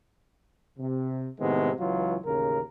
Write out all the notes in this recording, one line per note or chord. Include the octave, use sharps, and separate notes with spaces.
C3
A2 C3 D#3 G#3 B3
C#2 E3 F#3 F4
A1 D#2 C#3 A#4